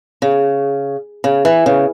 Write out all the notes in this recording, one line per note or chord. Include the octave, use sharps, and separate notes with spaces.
C#3
C#3
E3
C#3